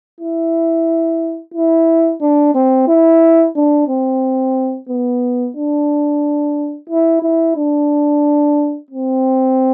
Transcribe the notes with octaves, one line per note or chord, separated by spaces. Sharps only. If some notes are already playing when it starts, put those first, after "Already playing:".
E4
E4
D4
C4
E4
D4
C4
B3
D4
E4
E4
D4
C4